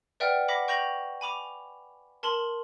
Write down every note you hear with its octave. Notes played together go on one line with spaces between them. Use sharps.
B4 D5 E5 F#5 G5 F6
F#5 B5 D6 A#6 B6
G5 C#6 G6 A#6 F7 F#7
G#5 B5 D6 F7
A#4 A5 C6 F#7